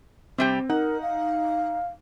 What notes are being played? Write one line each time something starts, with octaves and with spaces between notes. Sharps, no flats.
C3 G3 C4 G4
D#4 A#4 F#5
F5